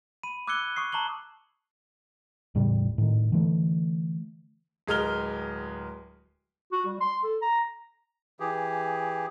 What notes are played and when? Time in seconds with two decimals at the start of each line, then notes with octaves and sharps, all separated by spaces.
0.23 B5 D#7
0.47 D6 E6 F#6 G#6 C#7 G7
0.76 C#6 D#6 C7
0.92 A5 A#5 C#6 F#7 G7
2.55 E1 A2 C#3 G3
2.98 A2 D#3
3.32 D3 E3 A3
4.88 D1 G#3 A#4 F6 G7
6.72 F#4
6.86 G3
7.01 C6
7.24 A4
7.42 A#5
8.40 E3 G4 G#4